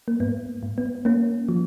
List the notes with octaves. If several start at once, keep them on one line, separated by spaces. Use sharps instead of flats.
A#3
G#2 B3
G#2
B3
A#3 C#4
F3